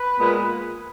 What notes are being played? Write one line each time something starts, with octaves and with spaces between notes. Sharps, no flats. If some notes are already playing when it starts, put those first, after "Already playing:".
Already playing: B4
A#2 G#3 B3